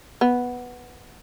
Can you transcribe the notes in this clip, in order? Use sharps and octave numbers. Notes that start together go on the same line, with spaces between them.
B3